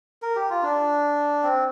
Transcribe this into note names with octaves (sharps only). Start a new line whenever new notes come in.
A#4
G4
F4
D4
C4